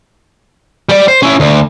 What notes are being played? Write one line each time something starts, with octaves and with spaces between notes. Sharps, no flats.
G3 D5
C5
C#4 E4
D2